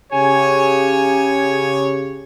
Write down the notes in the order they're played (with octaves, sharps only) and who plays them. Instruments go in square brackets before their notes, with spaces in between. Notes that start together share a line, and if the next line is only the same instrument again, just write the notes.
[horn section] C#3 G4 C#5 [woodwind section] G#5